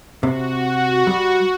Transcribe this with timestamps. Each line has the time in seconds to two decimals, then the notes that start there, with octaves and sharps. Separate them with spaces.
0.23 C3 F#4
1.07 G3